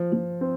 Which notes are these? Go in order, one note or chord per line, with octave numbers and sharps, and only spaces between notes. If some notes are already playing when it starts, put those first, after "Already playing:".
Already playing: F3
F3
C4